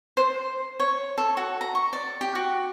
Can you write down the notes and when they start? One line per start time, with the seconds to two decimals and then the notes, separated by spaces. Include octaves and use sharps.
0.17 C5
0.80 C#5
1.18 A4
1.37 F#4
1.61 A#5
1.75 C#6
1.93 D5
2.21 G4
2.35 F#4